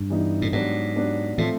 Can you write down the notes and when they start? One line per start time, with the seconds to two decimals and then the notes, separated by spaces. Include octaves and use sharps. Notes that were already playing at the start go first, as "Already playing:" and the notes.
Already playing: G2
0.10 E3 G3 B3 D#4
0.42 A2
0.52 G#2 F#3 B3 D4 G4
0.95 F#3 B3 D4 G4
1.38 A2 F3 A3 C4 F4